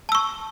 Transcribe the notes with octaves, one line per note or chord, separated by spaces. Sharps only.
A5 C#6 E6